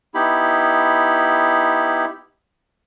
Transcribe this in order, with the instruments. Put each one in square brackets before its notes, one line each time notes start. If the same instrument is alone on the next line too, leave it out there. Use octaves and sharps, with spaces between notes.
[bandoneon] B3 D#4 E4 G4 B5